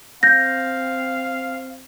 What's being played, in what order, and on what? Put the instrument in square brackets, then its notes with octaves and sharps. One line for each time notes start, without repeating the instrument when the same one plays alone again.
[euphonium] C4 [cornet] F5 [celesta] G6 A#6